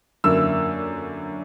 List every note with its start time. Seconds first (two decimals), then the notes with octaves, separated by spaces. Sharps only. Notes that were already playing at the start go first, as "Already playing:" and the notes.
0.24 F#2 D3 A#3 E4 E6